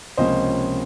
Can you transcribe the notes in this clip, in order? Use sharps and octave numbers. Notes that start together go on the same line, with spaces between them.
C#2 C3 F3 A#3 C#4 C5 D#5